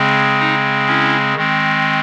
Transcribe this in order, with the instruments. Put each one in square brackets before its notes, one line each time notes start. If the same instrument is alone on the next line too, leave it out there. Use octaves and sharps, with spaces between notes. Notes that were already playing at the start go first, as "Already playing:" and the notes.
Already playing: [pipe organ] C#3 G#3 C4
D#4
C#4 E4
D#3 G#3 C4